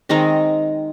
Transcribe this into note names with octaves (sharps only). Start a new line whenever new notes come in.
D#3 G#3 C4 D#4 A#5